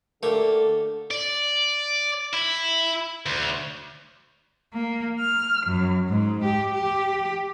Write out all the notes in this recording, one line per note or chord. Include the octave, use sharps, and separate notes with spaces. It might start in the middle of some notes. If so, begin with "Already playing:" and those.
D3 A3 A#3 G4 A4 A#4
D5
E4
D2
A#3
F6
F#2
G#2
G4
G4